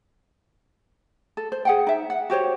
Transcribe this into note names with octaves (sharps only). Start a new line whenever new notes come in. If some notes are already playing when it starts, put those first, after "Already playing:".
A4
C5
G#4 F#5 G5
D#4 E5
F#5
F#4 G4 C5 C#5